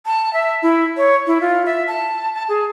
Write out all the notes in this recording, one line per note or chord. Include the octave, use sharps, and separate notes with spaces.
A5
E5
E4
C#5
E4
F4
E5
A5
A5
G#4